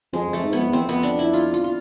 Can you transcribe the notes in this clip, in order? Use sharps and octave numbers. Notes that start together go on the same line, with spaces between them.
F2 G#3
F2
A3
G#2
B3
F2
E2 C4
F2
B3
D4
E4
F4
F4
F4